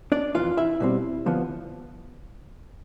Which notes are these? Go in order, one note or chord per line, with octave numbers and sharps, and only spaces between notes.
D4 D5
F2 C3 E3 F4 F5
E4 E5
B2 G3 C4
D3 F3 B3